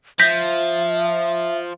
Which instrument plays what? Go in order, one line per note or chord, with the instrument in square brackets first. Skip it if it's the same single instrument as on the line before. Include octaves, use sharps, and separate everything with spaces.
[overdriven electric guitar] F3 [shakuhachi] E5 [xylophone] G6 A#6 B6